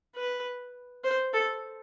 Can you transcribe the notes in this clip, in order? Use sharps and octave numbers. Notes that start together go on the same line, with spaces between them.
B4
C5
A4